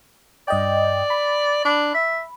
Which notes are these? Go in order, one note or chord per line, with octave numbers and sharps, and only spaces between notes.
G2 D5 D#5 G5
B5
D4
E5